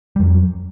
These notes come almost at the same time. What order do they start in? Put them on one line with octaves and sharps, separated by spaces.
G3 F2 F#3